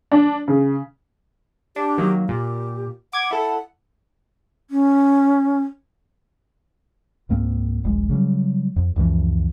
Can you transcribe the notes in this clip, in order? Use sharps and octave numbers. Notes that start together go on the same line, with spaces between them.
D4
C#3
D4 G4
D#3 F#3 A#3
A#2 G4
F#5 D6 G#6
E4 A4
C#4
C#2 G#2 A#3 C4
D#1 A#1 G#3
C#3 F#3 G3
F2
C#2 F#2 E3 F3